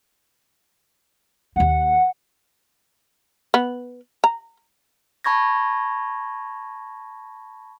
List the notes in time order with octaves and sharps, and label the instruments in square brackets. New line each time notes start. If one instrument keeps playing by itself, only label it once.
[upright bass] D#2 A#3 [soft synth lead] F#5
[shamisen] B3
A#5
[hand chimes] A5 B5 C#6 G#6 A#6